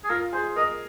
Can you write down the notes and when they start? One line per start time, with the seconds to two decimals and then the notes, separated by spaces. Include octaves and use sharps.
0.04 G#4
0.10 F4 A#4
0.33 G#4 C5
0.56 A#4 D#5